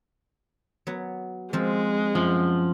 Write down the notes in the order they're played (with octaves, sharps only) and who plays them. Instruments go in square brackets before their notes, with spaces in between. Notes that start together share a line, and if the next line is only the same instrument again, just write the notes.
[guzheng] F#3 B3
[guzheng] F3 C4 [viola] G#3
[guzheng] F#2 [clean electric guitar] F3